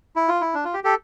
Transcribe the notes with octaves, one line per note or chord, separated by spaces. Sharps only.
E4
F4
E4
D4
F4
G4
G4 A4